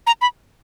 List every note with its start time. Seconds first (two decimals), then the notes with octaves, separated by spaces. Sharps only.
0.07 A#5
0.21 B5